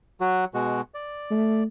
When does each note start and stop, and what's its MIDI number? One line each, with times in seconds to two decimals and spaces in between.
0.21 0.45 54
0.21 0.45 66
0.54 0.81 47
0.54 0.81 56
0.54 0.81 66
0.94 1.63 74
1.31 1.65 57